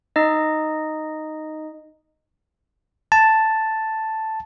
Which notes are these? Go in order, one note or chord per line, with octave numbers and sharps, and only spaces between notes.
D#4 D#5
A5